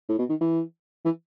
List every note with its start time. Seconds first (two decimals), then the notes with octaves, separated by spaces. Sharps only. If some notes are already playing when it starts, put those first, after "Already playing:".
0.09 A2
0.19 B2
0.29 D#3
0.41 E3
1.05 E3